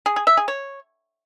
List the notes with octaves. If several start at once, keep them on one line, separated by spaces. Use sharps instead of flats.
G#4
G#4
E5
G#4
C#5